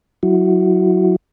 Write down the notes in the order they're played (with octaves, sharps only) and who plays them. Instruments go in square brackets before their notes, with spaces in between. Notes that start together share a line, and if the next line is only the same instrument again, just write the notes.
[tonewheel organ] F#3 E4 F#4